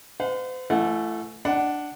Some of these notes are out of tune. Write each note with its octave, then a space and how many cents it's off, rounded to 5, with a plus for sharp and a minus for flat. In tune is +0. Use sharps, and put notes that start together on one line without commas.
C5 -40 F#5 -45
E3 +35 A3 +0 F#5 -30
D4 +5 F#5 +15